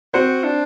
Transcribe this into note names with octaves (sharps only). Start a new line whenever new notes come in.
C4 F#4 C5
D4